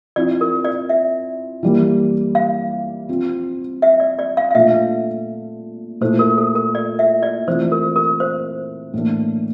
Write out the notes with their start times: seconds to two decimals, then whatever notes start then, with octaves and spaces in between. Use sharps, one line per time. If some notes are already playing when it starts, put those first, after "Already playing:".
0.16 F3 C4 E4 D5
0.41 A#4
0.65 D5
0.89 E5
1.63 E3 G3 A#3
2.35 F5
3.09 F3 C4 F4
3.82 E5
4.00 D5
4.19 D5
4.37 F5
4.51 F5
4.55 A#2 A3 D4 F4 E5
6.01 A#2 A3 E4 C5
6.19 A#4
6.38 A4
6.55 A#4
6.75 D5
6.99 E5
7.23 D5
7.47 E3 A3 C4 F4 C5
7.72 A#4
7.96 A#4
8.20 C5
8.94 A2 E3 A#3 D4